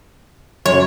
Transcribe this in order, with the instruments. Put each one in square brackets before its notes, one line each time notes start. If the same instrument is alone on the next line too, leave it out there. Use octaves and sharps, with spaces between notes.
[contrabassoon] F#2 [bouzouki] C#5